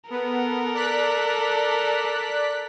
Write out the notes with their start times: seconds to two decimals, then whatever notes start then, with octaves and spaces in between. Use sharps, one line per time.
0.10 B3 A4 A#4
0.74 D5 F#6 B6